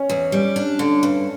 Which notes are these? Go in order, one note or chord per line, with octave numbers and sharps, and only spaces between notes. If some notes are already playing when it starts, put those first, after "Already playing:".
Already playing: C#4
E2
G3
D4
D3
G2